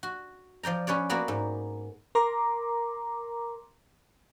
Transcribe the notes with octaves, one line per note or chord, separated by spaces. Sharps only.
F#4
F3 D5 G5 A#5
C#4 B4 C#5 D5
A#3 B3 F#4 D5 B5
G#2
A#4 A#5 C6 D6